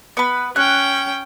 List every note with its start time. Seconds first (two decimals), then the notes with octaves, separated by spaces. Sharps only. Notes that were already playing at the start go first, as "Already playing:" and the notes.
0.17 B3 B4
0.56 C#4 G5 F#6